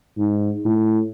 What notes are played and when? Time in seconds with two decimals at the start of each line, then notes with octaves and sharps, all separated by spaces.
0.18 G#2
0.64 A2